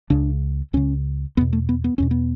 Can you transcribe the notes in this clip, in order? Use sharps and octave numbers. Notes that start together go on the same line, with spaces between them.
C#2 C#3 D4
C#2 C#3 C#4
E2 B2 B3
A3
B3
B3
E2 B2 C#4
B3